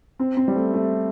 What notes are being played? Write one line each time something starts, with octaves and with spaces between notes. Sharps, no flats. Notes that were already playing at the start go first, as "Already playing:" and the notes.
C4
C4
G3
A3
A3